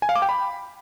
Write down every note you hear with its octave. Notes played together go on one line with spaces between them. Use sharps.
G#5
F5
D6
G5
B5